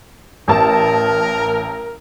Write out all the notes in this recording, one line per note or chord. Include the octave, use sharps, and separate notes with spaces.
A1 A#4 A5